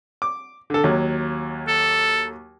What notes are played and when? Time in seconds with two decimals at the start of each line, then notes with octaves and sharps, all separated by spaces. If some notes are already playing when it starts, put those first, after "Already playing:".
0.22 D6
0.70 D3 A4
0.84 D#2 F#3
1.68 A4